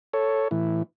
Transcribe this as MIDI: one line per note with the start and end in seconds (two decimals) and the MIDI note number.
0.13 0.48 69
0.13 0.48 73
0.51 0.83 45
0.51 0.83 52